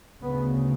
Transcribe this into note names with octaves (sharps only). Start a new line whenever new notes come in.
D2 C#3 B3